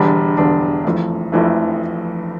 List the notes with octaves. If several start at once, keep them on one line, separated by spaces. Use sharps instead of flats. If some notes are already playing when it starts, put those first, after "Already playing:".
Already playing: E1 E2 D3 G3 D4
E1 E2 D3 G3 D4
F1 F2 E3 A3
F1 F2 E3 A3